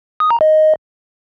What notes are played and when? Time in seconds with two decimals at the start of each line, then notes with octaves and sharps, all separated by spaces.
0.20 D#6
0.31 A#5
0.41 D#5